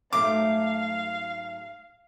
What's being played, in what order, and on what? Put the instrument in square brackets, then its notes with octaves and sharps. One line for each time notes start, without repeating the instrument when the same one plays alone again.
[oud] G#2 F#3 A3 [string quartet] F5 [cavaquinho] D6